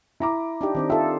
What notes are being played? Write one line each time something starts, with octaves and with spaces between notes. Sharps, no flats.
E4 A#5 D6
D4 D#4 G4
D#3 C4 D4
F4 A4 E5